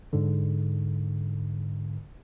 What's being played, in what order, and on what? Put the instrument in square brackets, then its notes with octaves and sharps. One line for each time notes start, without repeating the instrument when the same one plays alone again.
[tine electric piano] G#2 D3